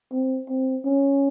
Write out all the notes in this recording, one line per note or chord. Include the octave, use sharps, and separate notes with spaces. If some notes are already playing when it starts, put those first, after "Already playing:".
C4
C4
C#4